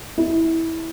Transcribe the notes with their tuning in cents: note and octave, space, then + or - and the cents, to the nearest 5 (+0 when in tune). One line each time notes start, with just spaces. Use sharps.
E4 -15